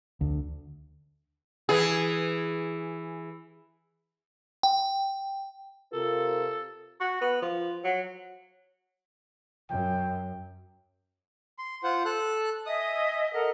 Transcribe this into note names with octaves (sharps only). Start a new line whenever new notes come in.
D2
E3 G#4
G5
C3 F4 A4 A#4
F#4
B3
F3
F#3
F#2 G5
C6
F4 C5 F#5
A4 F#6
D#5 E5 G#5 D#6
A4 A#4 D#5 F#5